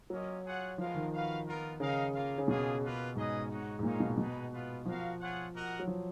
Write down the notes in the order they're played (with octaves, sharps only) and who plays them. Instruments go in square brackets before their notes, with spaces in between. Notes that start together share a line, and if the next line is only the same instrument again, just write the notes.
[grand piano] F#3 [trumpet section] A#3 C#4 F4 A#4 D#5
[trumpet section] F4 G#4 C#5 F#5
[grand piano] F3 [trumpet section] G#3 B3 F4 A#4 F5
[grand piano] D#3
[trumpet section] F#4 B4 F5
B3 F4 A#4
[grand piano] C#3 [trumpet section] D#4 A#4 F5
[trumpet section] A#3 F4 A#4 F5
[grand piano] C#3
[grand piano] B2 [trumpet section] A#3 F4 G#4
[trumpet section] A#3 F4 B4
[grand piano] G#2 [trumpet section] C#4 G#4 B4 D#5
[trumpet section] D#4 F#4 C#5 F#5
[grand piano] G#2
[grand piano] A#2 [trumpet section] D#4 A#4 C#5 F5
[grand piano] B2
[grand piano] B2 [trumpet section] B3 D#4 G#4 B4
[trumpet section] B3 F4 B4
[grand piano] F3 [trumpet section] F#4 A#4 F5
[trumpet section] F4 G#4 C#5 F#5
F#4 A#4 D#5 F#5
[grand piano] F#3
F3